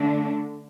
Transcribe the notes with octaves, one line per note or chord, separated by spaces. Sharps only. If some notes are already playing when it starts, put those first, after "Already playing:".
Already playing: D3 A3 D4